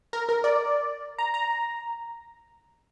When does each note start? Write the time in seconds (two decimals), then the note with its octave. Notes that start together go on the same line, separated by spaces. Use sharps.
0.13 A#4
0.29 A#4
0.44 D5
1.18 A#5
1.34 A#5